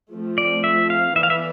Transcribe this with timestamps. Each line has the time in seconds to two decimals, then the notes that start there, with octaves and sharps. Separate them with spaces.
0.11 F3 A3 C4
0.38 D5
0.64 E5
0.90 F5
1.16 E3 B3 E4 A4 D5 E5
1.23 F5
1.30 E5